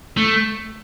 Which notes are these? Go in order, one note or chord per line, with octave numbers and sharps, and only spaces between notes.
A3